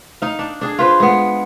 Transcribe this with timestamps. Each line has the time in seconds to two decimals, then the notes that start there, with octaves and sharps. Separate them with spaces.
0.22 D#4 F5
0.39 D4
0.61 D4 G#4
0.79 F4 B4 C5
1.00 G#3 B3